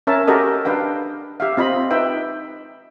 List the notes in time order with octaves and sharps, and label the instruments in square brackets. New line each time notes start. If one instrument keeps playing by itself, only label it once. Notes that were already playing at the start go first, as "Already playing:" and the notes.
[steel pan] C#4 A#4 C#5 E5 A5
F#4 G4 A4 A#4 D#5
D4 B4 F5 G5
G4 E5 F5
C4 F4 D#5 B5
D#4 B4 E5 G5